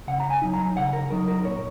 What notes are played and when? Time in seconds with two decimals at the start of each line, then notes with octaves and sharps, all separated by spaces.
0.07 C#3 F#5
0.20 A#5
0.30 G#5
0.42 F#3 D#4
0.54 A#5
0.76 C#3 F#5
0.93 A#4
1.10 F#3 D#4 A#4
1.28 A#4
1.40 A#4
1.45 A#2 C#5